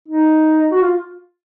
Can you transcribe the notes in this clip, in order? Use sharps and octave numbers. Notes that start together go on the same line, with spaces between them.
D#4
F#4
F4